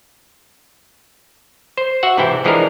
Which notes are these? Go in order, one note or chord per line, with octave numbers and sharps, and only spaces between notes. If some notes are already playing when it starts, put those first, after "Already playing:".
C5
F#4 E5 F#5
G#2 C3 E3 C4 E4 G5
E3 F3 G#3 D4 E4 A#4